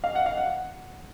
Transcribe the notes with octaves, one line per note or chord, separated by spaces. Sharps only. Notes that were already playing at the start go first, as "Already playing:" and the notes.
F5
F#5
F5
F#5